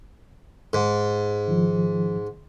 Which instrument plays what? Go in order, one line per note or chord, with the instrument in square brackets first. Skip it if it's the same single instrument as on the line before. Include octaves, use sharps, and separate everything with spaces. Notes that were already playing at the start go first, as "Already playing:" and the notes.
[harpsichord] G#2
[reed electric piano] D#3 F3